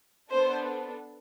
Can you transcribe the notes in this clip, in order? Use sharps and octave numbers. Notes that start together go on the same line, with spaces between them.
B3 D4 A4 C5